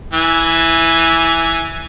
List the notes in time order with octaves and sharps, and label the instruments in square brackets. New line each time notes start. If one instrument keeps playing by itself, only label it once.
[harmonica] E3 G#5